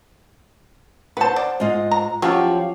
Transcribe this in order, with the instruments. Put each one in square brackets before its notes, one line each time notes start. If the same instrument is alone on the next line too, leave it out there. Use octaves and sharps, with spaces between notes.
[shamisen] B4 A5 [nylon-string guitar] C5 F#5
[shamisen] D5
[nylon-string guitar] G#2 F4 D#5
[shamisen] A#5
[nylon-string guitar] F3 F4 G4 [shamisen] F#3 C#4 C#5